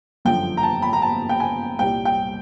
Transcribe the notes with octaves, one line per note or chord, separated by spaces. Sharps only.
G1 F#2 D3 F3 G5
A#5
A5
B5
A#5
A5
G5
G#5
C2 A#2 G3 G5
G5